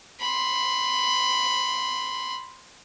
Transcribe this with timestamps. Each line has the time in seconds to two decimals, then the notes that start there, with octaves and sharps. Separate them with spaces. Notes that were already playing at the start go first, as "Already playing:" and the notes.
0.20 B5 C6